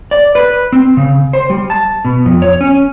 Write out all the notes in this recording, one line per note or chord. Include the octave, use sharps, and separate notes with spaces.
D5
B4
C4
C#3
C5
G3
A5
B2
F2
C#5
C#4